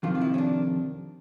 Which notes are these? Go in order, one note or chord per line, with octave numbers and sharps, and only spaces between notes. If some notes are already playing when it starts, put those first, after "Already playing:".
F2 C3 D#3 F4
F4
E4
C#4
D4